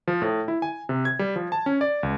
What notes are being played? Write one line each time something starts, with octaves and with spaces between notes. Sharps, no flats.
F3
A2
E4
G#5
C3
G#6
G3
F3
A5
C#4
D5
C#2